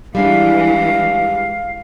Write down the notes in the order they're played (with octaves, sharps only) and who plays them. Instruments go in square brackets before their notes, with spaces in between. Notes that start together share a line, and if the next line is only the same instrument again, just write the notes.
[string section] E3 [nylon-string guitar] G3 G#3 D4 [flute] F5